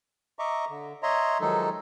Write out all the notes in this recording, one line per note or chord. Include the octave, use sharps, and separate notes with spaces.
D#5 E5 A#5 C#6 D6
D3
C#5 D#5 E5 A#5 C6
D#3 F3 F#3 G#3 D#4 A4